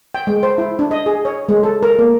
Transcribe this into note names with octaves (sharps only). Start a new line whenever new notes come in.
G5
G#3
C5
E4
D4
D#5
G#4
C#5
G#3
A4
A#4
A#3